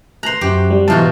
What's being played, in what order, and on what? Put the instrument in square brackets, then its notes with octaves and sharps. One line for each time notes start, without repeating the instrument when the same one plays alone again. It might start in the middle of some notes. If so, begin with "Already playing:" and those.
[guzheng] C5 A#5 [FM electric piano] F#6
[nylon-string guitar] F#2 [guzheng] G4
[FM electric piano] G3
[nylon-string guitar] G#2 E3 F#3 [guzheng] B2 F4 F#4 [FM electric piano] A5 G6